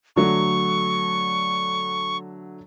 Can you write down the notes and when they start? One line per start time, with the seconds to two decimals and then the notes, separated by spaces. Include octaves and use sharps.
0.16 D3 F#3 A3 C#6